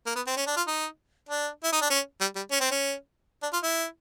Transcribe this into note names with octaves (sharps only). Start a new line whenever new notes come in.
A#3
B3
C4
C#4
D4
F4
D#4
D4
E4
D#4
D4
C#4
G3
G3
C#4
C4
C#4
D4
F4
E4